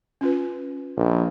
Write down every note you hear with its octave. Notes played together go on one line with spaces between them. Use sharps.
C#4 F4 B4
A#1